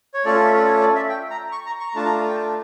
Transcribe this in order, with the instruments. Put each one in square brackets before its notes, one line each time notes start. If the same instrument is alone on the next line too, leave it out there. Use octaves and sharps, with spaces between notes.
[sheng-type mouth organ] C#5
A3 C#4 F4 A4 D5
E5
D5
C#5
D5
E5
G5
A#5
C#6
A#5
C#6
A#5
A3 D4 F4 A5
A#5
G5
A5